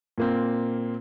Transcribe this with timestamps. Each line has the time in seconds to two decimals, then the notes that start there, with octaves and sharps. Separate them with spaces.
0.18 A#2 A#3 C4